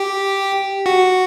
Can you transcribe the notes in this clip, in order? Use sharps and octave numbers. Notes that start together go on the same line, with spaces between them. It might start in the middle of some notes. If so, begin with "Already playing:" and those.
Already playing: G4
F#4